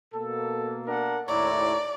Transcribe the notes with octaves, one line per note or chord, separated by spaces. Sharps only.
B2 A#3 A4
D4 A#4 F#5
D#2 A2 E4 C#5 D5 A#5